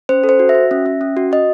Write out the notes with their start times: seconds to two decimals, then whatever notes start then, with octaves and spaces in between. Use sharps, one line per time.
0.09 C#4 C5
0.24 A4
0.29 C5
0.39 F#4
0.49 E5
0.54 F#4
0.71 C#4
0.86 C#4
1.01 C#4
1.17 F#4
1.31 F#4 D#5